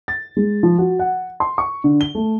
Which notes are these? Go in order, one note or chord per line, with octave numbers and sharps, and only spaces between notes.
A6
G#3
F3
F#4
F#5
C6
C#6
D3
G7
A3